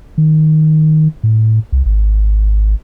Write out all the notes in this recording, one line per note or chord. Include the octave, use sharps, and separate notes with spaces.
D#3
A2
C2
G#1